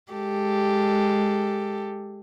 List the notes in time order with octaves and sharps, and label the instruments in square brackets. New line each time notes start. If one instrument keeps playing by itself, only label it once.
[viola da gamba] G#3 G4 A4